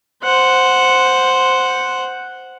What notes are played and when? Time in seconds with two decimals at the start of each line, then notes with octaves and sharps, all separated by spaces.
0.24 C5 F#5